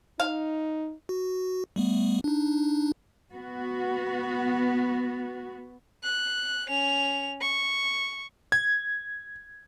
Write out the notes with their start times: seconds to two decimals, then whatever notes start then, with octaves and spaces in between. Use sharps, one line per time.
0.20 D#4 F5
1.09 F#4
1.76 G3 A3 B3
2.24 D4 D#4
3.33 B3 F#4
6.04 F#6
6.68 C#4 F7
7.41 C#6
8.52 G#6